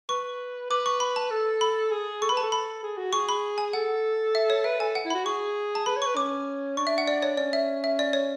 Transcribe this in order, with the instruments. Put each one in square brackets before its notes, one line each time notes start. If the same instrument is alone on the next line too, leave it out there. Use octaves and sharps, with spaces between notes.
[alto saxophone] B4 [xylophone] C#6
[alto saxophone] B4 [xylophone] D6
[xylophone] C#6
B5
A5
[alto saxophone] A4
[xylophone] B5
[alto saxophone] G#4
[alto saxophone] A4 [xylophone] C#6
[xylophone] B5
[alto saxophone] B4
[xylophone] A5
[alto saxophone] A4
[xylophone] B5
[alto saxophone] G#4
F#4
[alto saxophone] G#4 [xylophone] C#6
[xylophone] B5
G#5
[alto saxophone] A4 [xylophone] F#5
[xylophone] E5
C#5
[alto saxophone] B4 [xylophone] E5
[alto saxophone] A4 [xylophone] G#5
[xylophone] F#5
[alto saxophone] E4
[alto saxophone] F#4 [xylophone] B5
[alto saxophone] G#4 [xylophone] C#6
[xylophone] A5
[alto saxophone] B4 [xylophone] B5
[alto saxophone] C#5
[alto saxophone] B4 [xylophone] C#6
[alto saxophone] C#4 [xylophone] D6
[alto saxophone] D4 [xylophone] C#6
[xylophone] E5
F#5
D5
C#5
[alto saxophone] C#4 [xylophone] D5
[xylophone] E5
E5
D5
C#5